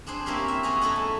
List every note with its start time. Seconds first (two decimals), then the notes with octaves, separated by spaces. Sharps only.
0.07 C4 D4 G#4 C5
0.26 A#3 C4 C#4 E4 G4 A#4
0.48 E5
0.63 B3 C#4 G#4 C#5 A#5
0.81 F#2 E4 A4 D#5 F#5
0.96 A3